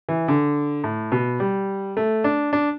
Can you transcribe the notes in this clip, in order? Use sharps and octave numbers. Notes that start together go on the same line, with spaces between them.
E3
D3
A2
B2
G3
A3
D4
D4